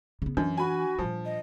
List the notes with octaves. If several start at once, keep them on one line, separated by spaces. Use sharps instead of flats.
C#3 B3
F#2 E3 D4
F#4 G#5 B5
A#2 F3 G3
D#5